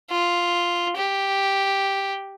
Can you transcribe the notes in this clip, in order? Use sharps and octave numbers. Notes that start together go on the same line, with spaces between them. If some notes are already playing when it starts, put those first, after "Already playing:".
F4
G4